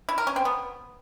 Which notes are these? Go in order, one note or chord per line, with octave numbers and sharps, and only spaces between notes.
E4
A#4
C#4
C4
B3